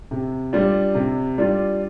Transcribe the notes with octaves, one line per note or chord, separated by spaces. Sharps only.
C3
G3 D4 F4
C3
G3 D4 F4